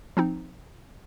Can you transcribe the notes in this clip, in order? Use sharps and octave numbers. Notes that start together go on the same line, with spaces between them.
F3 C4 D#4